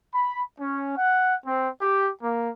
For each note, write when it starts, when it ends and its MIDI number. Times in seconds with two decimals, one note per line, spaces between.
0.14 0.43 83
0.60 0.94 61
0.97 1.35 78
1.46 1.69 60
1.81 2.10 67
2.23 2.50 58